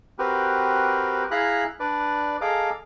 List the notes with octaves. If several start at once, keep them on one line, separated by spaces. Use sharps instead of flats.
C4 F#4 G4 A#4 B4
E4 G#4 F5 A#5 B5 F#6
D4 B4 D5
G#4 A4 D#5 F5 A#5 D6